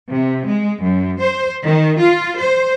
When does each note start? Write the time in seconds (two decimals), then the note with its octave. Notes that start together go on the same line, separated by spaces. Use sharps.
0.10 C3
0.46 G#3
0.81 F#2
1.21 C5
1.63 D#3
1.98 F4
2.37 C5